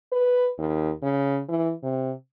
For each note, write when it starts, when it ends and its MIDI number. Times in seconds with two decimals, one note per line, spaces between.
0.12 0.49 71
0.59 0.91 39
1.02 1.41 49
1.49 1.72 52
1.83 2.12 48